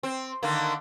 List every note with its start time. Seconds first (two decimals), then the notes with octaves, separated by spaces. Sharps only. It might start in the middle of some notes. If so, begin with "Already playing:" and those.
0.03 C4
0.43 D3 D#3 A#3